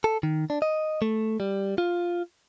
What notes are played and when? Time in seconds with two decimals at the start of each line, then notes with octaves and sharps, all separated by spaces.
0.04 A4
0.23 D#3
0.50 D4
0.62 D#5
1.02 A3
1.40 G3
1.78 F4